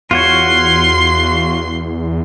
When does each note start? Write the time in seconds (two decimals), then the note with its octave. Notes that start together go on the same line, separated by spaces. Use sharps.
0.11 E2 F4 F#4 C#5 C6